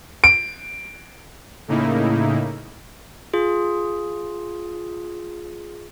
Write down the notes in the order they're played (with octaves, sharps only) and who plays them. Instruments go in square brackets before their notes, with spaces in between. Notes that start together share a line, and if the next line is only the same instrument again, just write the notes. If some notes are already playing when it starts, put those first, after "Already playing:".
[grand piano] D7
[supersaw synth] A2 C#3 A#3 D#4 E4
[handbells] F4 G#4